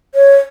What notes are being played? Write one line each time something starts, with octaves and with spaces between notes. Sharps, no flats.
C#5